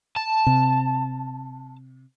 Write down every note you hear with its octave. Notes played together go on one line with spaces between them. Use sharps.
A5
C3